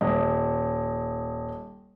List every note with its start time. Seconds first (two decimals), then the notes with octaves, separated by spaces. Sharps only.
0.01 D#1 D#5